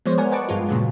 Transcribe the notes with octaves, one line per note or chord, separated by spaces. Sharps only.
F3 G#3 B3 C5 C#5
A#4 D5 F#5 G#5
B4 D#5 F#5 A5 C#6 D6
G2 G#3 F4
A#2 C#3 F#3